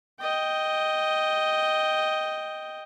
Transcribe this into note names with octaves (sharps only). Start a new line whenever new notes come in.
D#5 G5